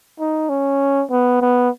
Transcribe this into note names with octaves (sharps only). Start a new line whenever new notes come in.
D#4
C#4
B3
B3